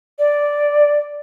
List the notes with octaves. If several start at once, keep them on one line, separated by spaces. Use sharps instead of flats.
D5